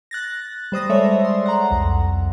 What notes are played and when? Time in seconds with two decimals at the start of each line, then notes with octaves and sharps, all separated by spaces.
0.11 F#6 A6 A#6
0.72 G3 C5 D#6 A#6
0.89 G3 G#3 A4 C#5 D5 E5
1.25 C6
1.46 F#5 A#5
1.71 C2 F2